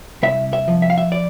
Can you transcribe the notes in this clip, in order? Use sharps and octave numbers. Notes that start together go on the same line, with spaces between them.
C2 E5
E5
F3
E5
F5
E5
D5